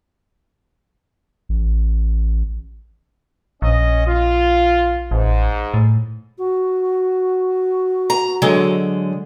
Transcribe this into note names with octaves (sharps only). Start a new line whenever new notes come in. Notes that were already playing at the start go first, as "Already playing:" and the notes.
A1
A#1 C#4 D#5
F4
A1 G#2
A2
F#4
A#5
D3 F#3 G#3